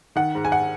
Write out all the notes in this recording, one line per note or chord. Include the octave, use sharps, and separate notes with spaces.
D#3 F#5
G#2
G#5
F#5